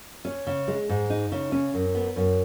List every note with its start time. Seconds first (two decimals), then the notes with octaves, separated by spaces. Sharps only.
0.25 C#4
0.47 C#3
0.68 G#3
0.89 G#2
1.10 D#4
1.32 C#3
1.52 C#4
1.74 F#2
1.95 B3
2.16 F#2